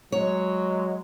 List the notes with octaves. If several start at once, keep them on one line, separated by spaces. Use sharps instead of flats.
F#3 G#3 C#5